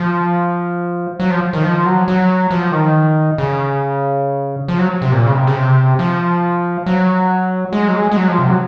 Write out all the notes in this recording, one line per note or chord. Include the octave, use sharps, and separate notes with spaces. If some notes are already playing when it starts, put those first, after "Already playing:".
Already playing: F3
F#3
F3
D#3
F3
F#3
F#3
F3
D#3
C#3
F3
F#3
C3
A#2
C#3
C3
C#3
C3
F3
F#3
G#3
F#3
G#3
G#3
F#3
F3
C3
F#3